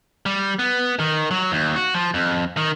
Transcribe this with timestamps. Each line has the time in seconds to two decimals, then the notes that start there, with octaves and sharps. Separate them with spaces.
0.26 G3
0.59 B3
0.99 D#3
1.31 F#3
1.52 D#2
1.76 F#4
1.94 F3
2.14 F2
2.57 D#3